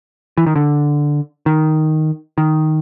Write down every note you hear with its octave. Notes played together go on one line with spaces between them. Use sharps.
E3
D#3
D3
D#3
D#3